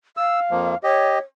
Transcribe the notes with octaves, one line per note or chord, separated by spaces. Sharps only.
F5 E6
F2 F3 A#3
G4 C#5 D#5